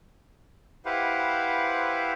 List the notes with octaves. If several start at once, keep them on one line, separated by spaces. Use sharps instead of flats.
E4 G4 B4 C5 F5 F#5